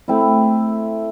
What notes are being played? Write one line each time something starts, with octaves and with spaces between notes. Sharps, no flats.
A3 C4 E4